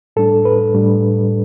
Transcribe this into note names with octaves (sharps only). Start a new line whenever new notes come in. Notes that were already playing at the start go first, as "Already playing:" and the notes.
A2 G3 D4 A4
B4
A2 G3 D4